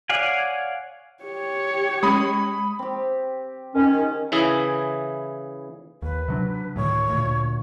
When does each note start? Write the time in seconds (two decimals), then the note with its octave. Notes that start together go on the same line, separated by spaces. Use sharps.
0.09 C#5 D5 F5 F#5 G#5
1.23 G4 C#5
2.03 G#3 C#4 B5 D#6
2.79 C4 G4
3.74 D#3 C#4
3.94 G#4
4.32 C#3 E3 E4 G#4
6.02 D#2 B4
6.28 C3 F#3 D4
6.76 D2 A2 D#3 C#5
7.09 D2 A#2